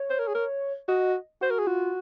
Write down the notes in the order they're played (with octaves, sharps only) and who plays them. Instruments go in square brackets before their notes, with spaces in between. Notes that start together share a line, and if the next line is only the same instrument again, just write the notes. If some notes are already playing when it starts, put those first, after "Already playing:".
Already playing: [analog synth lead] C#5
[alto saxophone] C5
A#4
G#4
A#4
[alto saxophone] F#4 [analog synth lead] D#5
[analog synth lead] F#4 [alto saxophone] C5
[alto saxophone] A#4
G#4
[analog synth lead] F4 [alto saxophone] F#4